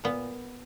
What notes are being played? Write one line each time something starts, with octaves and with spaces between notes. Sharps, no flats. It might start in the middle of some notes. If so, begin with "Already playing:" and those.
A#2 B3